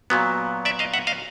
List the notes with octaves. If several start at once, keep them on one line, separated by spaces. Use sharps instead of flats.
A#2 F#3 B3
D5 E5
D#5 F5
E5 F#5
D#5 F5